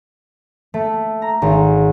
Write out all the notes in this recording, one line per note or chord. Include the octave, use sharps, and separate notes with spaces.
A3
A#5
G#1